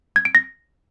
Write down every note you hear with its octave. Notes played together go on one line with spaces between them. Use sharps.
G#6
D7
A#6